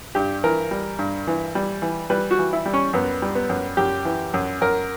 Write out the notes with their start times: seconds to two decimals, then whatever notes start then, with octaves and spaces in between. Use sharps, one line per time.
0.15 G2 G4
0.44 E3 A#4
0.71 G3
0.99 G2
1.27 E3
1.55 G3
1.82 E3
2.10 G3 B4
2.31 F#4
2.39 E3
2.53 E4
2.66 G3
2.73 C#4
2.93 F#2 B3
3.22 G3
3.35 B3
3.49 F#2
3.77 F#2 G4
4.05 E3
4.34 F#2
4.61 F#2 A#4